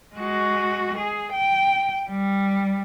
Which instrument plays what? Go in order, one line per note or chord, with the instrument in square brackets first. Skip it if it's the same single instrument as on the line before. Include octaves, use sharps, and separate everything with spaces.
[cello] G#3 F#4
G#4
G5
G3